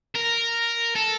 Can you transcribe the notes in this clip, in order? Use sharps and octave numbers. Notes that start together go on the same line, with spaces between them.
A#4
A4